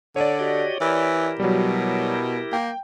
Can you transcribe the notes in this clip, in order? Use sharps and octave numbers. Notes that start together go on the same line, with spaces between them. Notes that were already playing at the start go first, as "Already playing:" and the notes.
D3 C#5 D5
F#4 G4 D#5
E3 E4 G4 A#4
B2 F#3 G3
A#3 G5